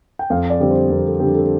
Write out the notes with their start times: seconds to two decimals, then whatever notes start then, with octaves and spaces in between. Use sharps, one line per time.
0.19 G5
0.30 F2 F5
0.50 D5
0.60 D3 G3 C4
0.71 C5
0.90 F2 A#4
1.05 A4
1.20 D3 G3 C4 G4
1.35 A4